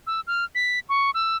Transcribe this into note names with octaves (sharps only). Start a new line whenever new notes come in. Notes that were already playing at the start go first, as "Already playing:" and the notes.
E6
F6
B6
C#6
E6